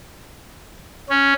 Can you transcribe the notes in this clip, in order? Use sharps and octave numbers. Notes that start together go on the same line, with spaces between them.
C#4